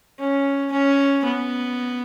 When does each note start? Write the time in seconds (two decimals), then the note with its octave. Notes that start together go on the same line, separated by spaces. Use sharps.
0.19 C#4
0.71 C#4
1.25 B3